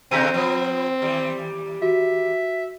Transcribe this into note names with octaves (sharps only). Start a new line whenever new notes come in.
B2 D3 C4 F#4 G6 B6 D#7
F3 B3
D#2 G3
F#4 E5